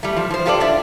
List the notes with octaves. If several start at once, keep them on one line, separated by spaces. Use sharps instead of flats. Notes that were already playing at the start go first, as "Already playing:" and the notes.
G3 A3
F3
F3 C5
F4 G4 A4 B4 D5
D4 D5 E5